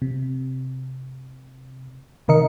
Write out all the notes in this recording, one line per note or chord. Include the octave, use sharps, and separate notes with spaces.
C3
C3 D#3 A#4 D#5 C#7